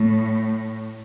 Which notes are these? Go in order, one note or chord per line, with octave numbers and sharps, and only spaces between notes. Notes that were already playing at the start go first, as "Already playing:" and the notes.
Already playing: A2